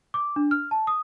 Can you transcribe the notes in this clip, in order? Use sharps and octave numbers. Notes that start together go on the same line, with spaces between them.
D6
D4
F6
A5
D#6